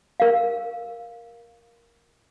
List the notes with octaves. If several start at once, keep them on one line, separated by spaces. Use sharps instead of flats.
A#4 F5